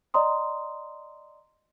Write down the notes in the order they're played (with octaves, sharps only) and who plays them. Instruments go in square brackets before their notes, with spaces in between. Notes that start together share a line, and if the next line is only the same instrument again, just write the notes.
[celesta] D5 D#5 A#5 C6 D#6